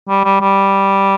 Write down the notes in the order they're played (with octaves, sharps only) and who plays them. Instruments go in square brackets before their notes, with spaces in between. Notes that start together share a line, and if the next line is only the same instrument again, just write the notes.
[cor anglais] G3
G3
G3